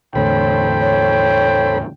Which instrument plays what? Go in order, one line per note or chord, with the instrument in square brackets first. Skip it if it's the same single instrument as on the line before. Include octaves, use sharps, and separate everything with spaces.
[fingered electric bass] E2 A2 D3 [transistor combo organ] A4 C5 B5 [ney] C#5 [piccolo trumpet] G5
[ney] C#5